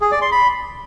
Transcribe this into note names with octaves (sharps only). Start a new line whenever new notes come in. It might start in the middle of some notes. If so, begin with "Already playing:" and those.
G#4
D5
C6
B5